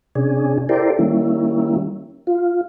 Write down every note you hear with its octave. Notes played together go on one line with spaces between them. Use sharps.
C3 C#4 D4 G#4
E4 G4 A4 A#4 C5 D5
D#3 G3 A#3 C#4 E4
F4